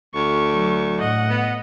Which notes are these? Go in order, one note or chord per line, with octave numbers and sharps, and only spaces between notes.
D2 C#6
F#3
A2 D#5 F#5
B3